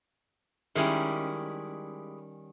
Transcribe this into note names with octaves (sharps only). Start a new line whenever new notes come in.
D#3 G3 G#3 C#4 E4 G4